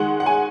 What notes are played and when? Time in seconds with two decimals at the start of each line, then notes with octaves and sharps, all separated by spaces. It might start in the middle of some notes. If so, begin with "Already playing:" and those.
Already playing: D#3 G#3 F#5
0.20 F#5
0.26 G#5